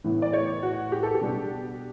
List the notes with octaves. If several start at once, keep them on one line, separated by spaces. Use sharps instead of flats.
A2 E3 B3
D5
C#5
F#4
G4
A4
G4
B2 G3 D4